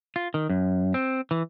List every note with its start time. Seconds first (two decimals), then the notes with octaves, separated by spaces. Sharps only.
0.16 F4
0.34 D#3
0.50 F#2
0.94 C4
1.31 E3